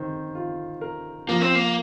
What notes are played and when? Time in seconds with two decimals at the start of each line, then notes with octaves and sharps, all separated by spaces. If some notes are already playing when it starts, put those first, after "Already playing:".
Already playing: D#3 C4
0.35 F4
0.81 A#4
1.28 F3 A#3
1.41 C4
1.55 A#3